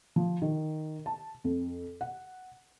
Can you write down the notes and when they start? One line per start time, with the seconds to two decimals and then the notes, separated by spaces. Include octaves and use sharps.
0.16 F3
0.42 D#3
1.06 A5
1.44 F2
2.01 F#5